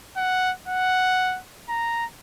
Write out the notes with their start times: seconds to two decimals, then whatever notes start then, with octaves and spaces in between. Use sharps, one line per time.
0.17 F#5
0.68 F#5
1.69 A#5